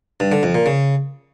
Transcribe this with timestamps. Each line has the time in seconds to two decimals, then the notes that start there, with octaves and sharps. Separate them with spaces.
0.20 G2
0.32 D3
0.43 F2
0.55 A#2
0.66 C#3